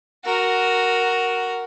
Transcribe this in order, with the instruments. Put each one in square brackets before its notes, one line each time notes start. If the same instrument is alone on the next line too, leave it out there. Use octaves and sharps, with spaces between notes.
[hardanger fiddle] F#4 A#4